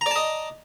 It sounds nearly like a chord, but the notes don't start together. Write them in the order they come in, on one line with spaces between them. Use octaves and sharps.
A#5 D5 A5 D#5